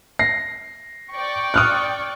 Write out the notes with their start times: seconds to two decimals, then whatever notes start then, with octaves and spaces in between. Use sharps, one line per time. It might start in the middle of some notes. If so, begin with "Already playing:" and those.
0.19 A#6 C7
1.13 D5 G5 C#6
1.54 D#6 F6 F#6